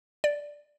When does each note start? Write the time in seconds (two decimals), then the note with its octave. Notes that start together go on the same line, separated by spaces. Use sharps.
0.24 D5